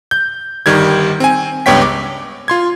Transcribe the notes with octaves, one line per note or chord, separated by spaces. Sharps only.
G6
G1 D#3 G3 G#6
C4 G#5
C#2 G2 B3 C#5 G5 B6
D6
F4 C6 G#6